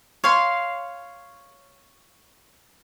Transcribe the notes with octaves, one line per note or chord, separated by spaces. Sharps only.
C#5 F5 C6